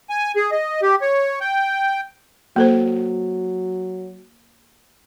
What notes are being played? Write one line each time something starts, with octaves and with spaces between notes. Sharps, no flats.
G#5
G#4
D#5
G4
C#5
G5
F#3 A#3 A4 C5